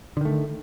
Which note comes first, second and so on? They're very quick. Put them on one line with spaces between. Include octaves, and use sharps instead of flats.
D3 D#3 A3